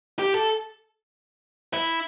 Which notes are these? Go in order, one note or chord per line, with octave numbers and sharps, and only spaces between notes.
G4
A4
E4